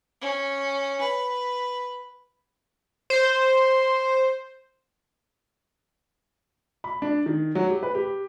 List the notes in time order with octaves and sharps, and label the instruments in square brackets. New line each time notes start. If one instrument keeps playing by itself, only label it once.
[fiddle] C#4
B4
[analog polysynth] C5
[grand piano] B5
D4
D#3
F#3
G4
B4
G4